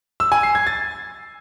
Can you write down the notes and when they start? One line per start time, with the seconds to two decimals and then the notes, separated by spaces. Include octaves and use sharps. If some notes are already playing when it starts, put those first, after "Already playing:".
0.20 E6
0.32 G#5
0.43 C7
0.55 G#6
0.67 A6